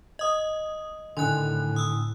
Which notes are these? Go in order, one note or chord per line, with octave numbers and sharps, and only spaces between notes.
D#5 D#6
A2 D3 D#3 G#5 C6 F#6
D#6 E6